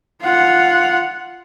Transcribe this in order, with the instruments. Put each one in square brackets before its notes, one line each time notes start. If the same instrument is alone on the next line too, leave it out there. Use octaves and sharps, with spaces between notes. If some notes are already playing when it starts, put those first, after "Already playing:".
[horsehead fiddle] F4 F#5